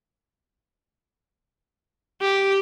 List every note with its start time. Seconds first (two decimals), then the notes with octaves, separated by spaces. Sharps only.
2.22 G4